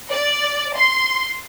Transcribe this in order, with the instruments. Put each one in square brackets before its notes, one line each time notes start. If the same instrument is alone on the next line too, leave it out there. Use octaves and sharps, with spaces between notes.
[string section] D5
C6